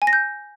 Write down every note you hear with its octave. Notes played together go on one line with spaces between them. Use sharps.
G#5
A#6
G6